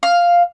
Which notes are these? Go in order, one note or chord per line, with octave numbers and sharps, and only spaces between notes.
F5